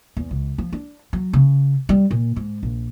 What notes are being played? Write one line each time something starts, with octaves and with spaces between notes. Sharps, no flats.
E2
C#2
F3
D4
F#3
C#3
G3
A#2
G#2
A#1